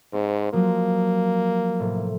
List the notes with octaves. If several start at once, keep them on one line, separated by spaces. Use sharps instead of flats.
G#2 C4
F3 F#3 G#3 A#3
A2 C3